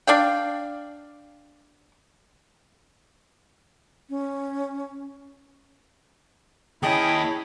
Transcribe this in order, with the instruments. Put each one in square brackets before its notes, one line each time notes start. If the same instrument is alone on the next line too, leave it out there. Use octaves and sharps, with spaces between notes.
[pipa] D4 D5 F5 G5
[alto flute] C#4
[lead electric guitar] D#2 D#5 [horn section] C#4 G#4 A5 [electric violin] E4 B5 [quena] G5